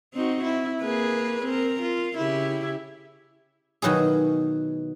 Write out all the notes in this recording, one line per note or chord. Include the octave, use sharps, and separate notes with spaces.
C4 D#4 F#4
E4
A#3 G#4 B4
C4 A#4
F4
C#3 E4 G4
B2 D#3 F#3 E4 G#4